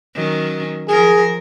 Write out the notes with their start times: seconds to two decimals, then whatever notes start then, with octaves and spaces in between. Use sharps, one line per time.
0.15 D#3 F#3 C#4
0.89 F3 G#4 A#4